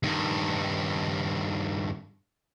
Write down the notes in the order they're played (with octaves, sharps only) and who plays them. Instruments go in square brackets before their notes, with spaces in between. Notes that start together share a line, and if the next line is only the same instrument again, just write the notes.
[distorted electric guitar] G2 D#3